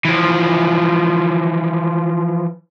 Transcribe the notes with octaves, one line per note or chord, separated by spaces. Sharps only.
E3 F3